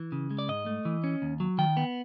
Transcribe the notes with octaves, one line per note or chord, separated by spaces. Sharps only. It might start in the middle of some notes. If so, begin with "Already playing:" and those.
Already playing: E3
C#3
G#3
D5
G#2 D#5
A3
E3
C#4
D#2
F#3
D#3 G5
B3